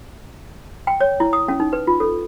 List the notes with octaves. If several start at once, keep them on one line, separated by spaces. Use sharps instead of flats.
G5
C#5
E4
D#6
C#4
D#4
B4
F4
A4